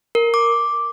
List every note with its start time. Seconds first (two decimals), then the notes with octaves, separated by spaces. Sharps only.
0.15 A#4
0.34 D6